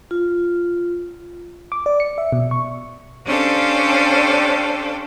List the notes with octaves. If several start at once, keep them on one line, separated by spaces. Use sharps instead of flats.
F4
D6
D5
C#7
E5
B2
C#6
C#4 D4 G4 A4 C5 F5